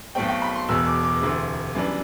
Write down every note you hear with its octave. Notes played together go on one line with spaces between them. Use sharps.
B1 B2 A3 C4 G5
G5
B5
C6
E1 E2 B2 E6
D6
D6
E1 D2 C3 E3
F#2 E3 G3 B3 D4